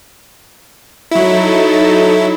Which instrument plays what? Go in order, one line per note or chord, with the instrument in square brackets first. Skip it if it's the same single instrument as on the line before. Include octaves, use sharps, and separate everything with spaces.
[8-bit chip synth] F#3 E4 [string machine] D#4 A4